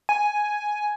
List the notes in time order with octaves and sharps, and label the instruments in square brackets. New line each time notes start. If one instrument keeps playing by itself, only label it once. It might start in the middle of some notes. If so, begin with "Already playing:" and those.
[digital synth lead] G#5